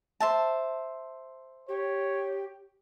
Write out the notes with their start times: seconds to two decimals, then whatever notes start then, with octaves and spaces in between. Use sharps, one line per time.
0.20 C5 E5 A5
1.68 G4 C#5